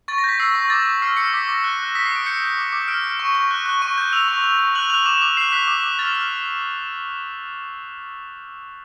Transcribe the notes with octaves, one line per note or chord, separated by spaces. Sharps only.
C#6 A6
A#6
G6 B6
E6 C7
C#6
D6 A6
D6
F6 C7
F6 C#7
D6 B6
D6 A#6
F#6
F#6
D#6 B6
C7
D#6 D7
G6 C#7
G6
D6
D6
F6 D7
F6
C#6
C#6
F#6
F#6
C#6 D#7
G6
E6 F7
C#6
C#6
C#6
F#6 F#7
F#6 F7
D6 E7
D6
F#6 C7
F#6 B6
D6
D6
F6 A6
F6